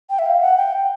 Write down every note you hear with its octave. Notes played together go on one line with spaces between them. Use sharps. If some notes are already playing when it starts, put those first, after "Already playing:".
G5
E5
F5
F#5
G5